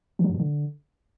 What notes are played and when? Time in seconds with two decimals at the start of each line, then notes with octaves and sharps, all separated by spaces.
0.19 E3
0.24 F#3
0.29 G2
0.35 A#2
0.40 D3